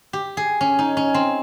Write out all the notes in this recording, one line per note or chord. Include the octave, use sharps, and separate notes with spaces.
G4
G#4
C#4
D#4
C#4
C4